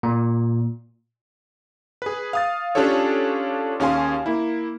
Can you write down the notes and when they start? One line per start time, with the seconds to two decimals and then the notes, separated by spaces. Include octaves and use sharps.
0.03 A#2
2.02 G#4 B4
2.33 F5 D#6 A6
2.75 C#4 D4 F4 G4 A4 C#5
3.80 D#2 C#4 G#4 F5 G#5 C6
4.26 A#3 E4